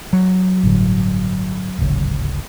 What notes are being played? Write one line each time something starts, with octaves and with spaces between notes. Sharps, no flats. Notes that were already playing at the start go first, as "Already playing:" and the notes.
F#3
G1 A2 D3
D1 G#1 C#3